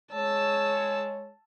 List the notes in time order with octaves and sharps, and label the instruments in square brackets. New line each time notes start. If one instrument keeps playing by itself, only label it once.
[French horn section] G#3 C#5 [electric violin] A5 E6